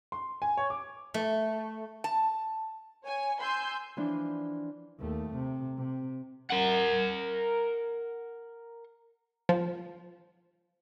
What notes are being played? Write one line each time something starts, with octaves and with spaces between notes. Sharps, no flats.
C6
G#5
C#5
D6
A3
A5
C#5 G#5
G#5 C6 E6 G6
E3 F3 D4
D#2 A3
C3
C3
A#4 F#5
F3